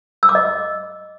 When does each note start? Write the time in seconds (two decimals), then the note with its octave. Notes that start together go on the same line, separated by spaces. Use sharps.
0.23 E6
0.29 D6
0.35 D#5